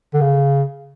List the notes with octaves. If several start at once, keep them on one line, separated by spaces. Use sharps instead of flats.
D3
C#3